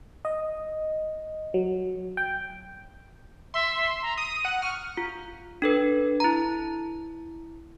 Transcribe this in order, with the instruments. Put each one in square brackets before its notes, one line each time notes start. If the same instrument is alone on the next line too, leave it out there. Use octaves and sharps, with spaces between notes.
[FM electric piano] D#5
F#3
G5
[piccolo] E5 [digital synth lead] C6
[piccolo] A#5
[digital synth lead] D#6 [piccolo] D#7
[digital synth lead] F#5
[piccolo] C#6 [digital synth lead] F6
[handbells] F4
D4 A4 B4
E4 A#5